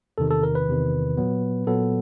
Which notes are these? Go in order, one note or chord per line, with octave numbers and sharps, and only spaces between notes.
E2 C3 D#3 A4
A4
A#4
B4
E2 C3 D#3
A#2 F#3 B3
A#2 F#3 B3 A4